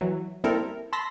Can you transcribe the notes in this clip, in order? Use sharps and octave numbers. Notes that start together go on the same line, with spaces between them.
E3 F#3
G3 A#3 C4 E4 A4 A#4
A5 B5 C6 E6 A#6 B6